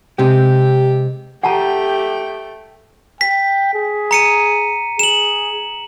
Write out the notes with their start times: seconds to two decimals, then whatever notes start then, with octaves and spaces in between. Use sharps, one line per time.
0.19 C3 G#3 G4
1.43 A3 G4 F#5 G5 A5 A#5
3.21 G5 B6
3.74 G#4
4.11 A#5 C#7 D#7
4.99 G#4 E7 F#7